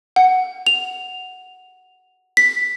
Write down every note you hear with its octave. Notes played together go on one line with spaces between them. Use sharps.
F#5
F7
B6